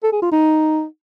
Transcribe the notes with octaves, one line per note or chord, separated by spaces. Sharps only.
A4
G#4
F4
D#4